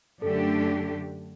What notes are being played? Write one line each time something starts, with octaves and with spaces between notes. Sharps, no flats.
F#2 D3 A3 D4 G4 A4